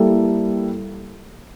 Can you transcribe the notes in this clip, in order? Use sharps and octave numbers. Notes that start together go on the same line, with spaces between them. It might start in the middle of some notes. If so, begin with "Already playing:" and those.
Already playing: G3 A#3 E4 A4